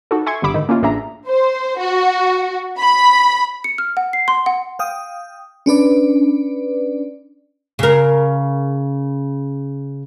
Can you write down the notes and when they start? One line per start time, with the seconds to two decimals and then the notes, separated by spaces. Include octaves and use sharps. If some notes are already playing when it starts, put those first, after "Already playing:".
0.11 D#4 F#4 A4
0.26 E5 G#5 C6 C#6 G#6
0.42 G1 G2 D3 B5 D6 E6
0.54 G#2 D#3 D#4
0.69 A#3 C#4 E4 F4
0.82 A1 D4 G#4 E5 A#5
1.27 C5
1.78 F#4
2.78 B5
3.64 C#7
3.78 F6
3.97 F#5
4.13 C7
4.28 C6
4.46 F#5
4.79 F5 G5 D#6
5.66 C#4 D4 B4 D5
7.79 C#3 A#4